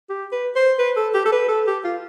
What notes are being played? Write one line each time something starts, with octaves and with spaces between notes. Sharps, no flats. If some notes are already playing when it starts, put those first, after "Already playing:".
G4
B4
C5
B4
A4
G4
A4
B4
A4
G4
F4